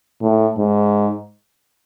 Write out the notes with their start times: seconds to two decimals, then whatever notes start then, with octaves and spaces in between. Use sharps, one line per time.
0.22 A2
0.57 G#2